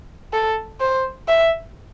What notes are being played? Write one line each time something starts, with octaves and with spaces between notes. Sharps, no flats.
A4
C5
E5